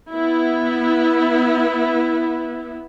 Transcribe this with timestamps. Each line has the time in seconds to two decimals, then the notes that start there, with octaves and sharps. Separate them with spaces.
0.12 B3 E4